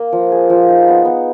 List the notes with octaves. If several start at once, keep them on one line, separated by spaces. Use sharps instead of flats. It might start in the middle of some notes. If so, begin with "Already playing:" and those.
Already playing: A#3
F3
G#4
F3
D#4
B3
B3